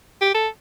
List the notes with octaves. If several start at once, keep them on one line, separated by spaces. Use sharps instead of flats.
G4
A4